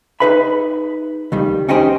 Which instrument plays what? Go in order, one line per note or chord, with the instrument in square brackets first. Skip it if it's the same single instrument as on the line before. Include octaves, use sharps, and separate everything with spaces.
[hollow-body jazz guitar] D#4 G#4 B4 E5 B5
C#2 D#3 G3
C#4 D#4 G4 G#4 C5